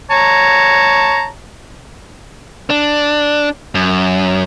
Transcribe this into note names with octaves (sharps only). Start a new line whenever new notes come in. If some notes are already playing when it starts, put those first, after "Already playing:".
C#5 A5 A#5
D4
F#2